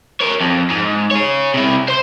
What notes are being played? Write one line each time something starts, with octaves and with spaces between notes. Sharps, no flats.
A#4 C#5
F2
G#2
G#4 C#5
C3 E4
C5 C6